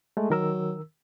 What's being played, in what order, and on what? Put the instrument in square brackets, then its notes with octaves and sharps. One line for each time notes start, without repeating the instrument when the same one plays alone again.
[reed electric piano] G#3 A3
[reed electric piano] D#3 A#4 E6 [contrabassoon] F#3